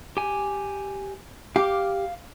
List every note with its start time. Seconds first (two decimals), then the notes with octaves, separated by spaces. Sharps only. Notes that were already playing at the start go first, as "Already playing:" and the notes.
0.17 G4 G#5
1.56 G4 F5 D6